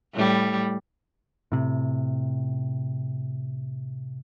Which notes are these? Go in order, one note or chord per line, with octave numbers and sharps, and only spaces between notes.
A2 G3
A2 C3